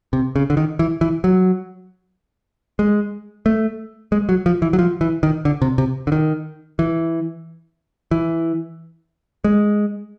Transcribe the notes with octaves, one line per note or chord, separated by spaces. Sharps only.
C3
C#3
D3
D#3
E3
E3
F#3
G#3
A3
G#3
F#3
F3
E3
F#3
F3
E3
D#3
D3
C3
C3
D3
D#3
E3
E3
G#3